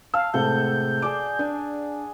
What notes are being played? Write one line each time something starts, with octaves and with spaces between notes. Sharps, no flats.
F5 A5 E6
A2 C3 G#3 A4 F#5 G6
G#4 D5 A5 D6
D4 G#5